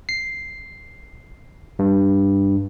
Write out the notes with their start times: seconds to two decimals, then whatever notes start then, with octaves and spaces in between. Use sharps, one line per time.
0.09 C7
1.79 G2